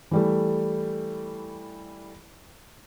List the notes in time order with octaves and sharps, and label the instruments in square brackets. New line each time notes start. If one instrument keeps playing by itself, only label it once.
[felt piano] E3 G3 A3